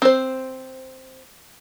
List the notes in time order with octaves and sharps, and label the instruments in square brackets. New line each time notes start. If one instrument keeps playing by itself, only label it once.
[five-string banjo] C4 C5